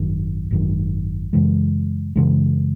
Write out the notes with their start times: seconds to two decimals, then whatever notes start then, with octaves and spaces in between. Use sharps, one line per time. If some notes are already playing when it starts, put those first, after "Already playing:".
Already playing: G#1 F#2 D#3
0.51 G#1 F#2 D#3
1.33 F#2 C#3 E3 G#3
2.16 F#2 C#3 E3 G#3